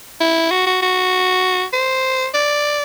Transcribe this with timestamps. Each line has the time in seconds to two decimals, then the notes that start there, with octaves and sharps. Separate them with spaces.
0.20 E4
0.51 F#4
0.67 F#4
0.82 F#4
1.73 C5
2.34 D5